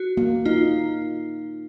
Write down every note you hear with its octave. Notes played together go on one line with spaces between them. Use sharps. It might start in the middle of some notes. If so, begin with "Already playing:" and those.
Already playing: F#4
A#3
D#4 F4